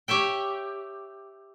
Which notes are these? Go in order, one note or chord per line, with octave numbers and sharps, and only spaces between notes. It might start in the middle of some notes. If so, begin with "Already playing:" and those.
G4 C#5 E5 G5